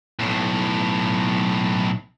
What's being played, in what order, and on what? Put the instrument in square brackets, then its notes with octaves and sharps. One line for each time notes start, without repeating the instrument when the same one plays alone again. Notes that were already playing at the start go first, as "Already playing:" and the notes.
[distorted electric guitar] B1 A2